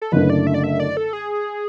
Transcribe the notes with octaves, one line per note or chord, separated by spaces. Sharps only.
A4
F#1 F#2 D3 A3 B4
D5
E5
D5
E5
D5
A4
G#4